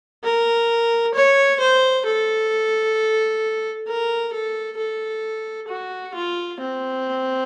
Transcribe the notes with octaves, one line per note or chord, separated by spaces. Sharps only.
A#4
C#5
C5
A4
A#4
A4
A4
F#4
F4
C4